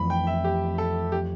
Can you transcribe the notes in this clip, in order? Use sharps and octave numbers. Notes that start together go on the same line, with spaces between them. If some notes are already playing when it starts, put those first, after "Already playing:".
Already playing: F2 E3 A3 B5
G5
E5
G4
A4
G4